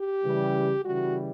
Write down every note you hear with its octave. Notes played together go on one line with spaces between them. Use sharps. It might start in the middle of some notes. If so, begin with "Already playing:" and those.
Already playing: G4
C#3 E3 G3
C#3 E3 G3 F#4